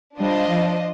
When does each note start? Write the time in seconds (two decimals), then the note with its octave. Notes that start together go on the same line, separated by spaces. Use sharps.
0.18 G3 D4 F4 C5 D#5
0.47 F3